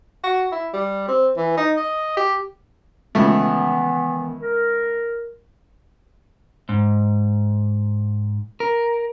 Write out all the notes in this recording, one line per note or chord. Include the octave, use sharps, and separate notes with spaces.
F#4
E4
G3
C4
E3
D#4
D#5
G4
C#2 D#3 E3 A3 B3
A#4
G#2
A#4